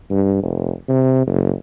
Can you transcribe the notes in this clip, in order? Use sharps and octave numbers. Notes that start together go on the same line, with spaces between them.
G2
F1
C3
F#1